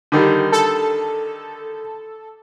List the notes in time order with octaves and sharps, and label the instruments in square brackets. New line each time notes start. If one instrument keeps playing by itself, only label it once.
[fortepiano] D3 D#3 G3
[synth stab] A4